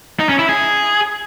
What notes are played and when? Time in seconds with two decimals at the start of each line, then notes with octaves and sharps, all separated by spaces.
0.19 D#4
0.29 C#4
0.39 E4
0.49 G#4